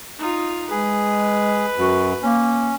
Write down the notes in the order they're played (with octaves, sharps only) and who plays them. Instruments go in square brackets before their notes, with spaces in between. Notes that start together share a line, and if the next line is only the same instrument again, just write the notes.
[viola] D#4 F4
[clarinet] G#3 [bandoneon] G#4 [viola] B4
[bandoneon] F#2 [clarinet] F#4
[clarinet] A#3 [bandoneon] C#4